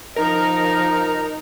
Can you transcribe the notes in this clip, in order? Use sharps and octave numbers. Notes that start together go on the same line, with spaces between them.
F3 D#4 A#4 A#5